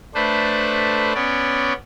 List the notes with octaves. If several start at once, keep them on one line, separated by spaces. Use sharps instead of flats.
A3 D4 B4 C5
B3 C#4 D5